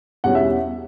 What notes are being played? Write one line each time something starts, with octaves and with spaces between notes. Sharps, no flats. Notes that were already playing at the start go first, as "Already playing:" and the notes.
E2 B2 G3 C#4 F#5
E5